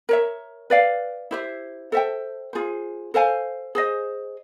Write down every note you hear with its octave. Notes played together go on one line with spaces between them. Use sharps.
A#4 C#5 E5
B4 D5 F5
E4 G4 C5 E5
A4 C5 E5 G5
F4 G#4 C5
A4 C5 F5 G#5
G#4 C5 D#5